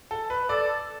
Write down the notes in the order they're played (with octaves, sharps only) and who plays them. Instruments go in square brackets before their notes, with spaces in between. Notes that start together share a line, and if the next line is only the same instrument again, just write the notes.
[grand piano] A4
B4
[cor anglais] A4 [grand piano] D5